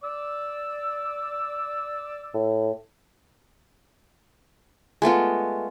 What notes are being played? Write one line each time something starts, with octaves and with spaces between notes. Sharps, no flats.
D5 E6
A2
G#3 A3 B3 F4